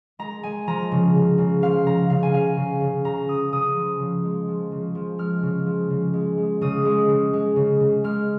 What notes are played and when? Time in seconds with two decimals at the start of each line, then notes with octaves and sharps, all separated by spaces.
0.19 G#3 A#5
0.43 G#3 G#5
0.67 F3 A#5
0.92 C#3
1.15 C#3
1.38 C#3
1.62 F3 F5
1.86 C#3 A#5
2.10 C#3 F5
2.23 G#5
2.33 C#3 F5
2.57 C#3
2.81 C#3
3.05 C#3 A#5
3.29 C#3 D#6
3.52 C#3 D#6
3.76 F3
3.99 C#3
4.24 G#3
4.48 F3
4.72 C#3
4.95 F3
5.19 G#3 F6
5.43 C#3
5.66 F3
5.90 C#3
6.13 G#3
6.38 G#3
6.61 C#3 D#6
6.85 G#3
7.09 C#3
7.33 G#3
7.56 C#3
7.80 C#3
8.04 G#3 F6